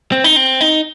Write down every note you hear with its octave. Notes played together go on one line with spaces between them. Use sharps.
C4
D#4
C4
D#4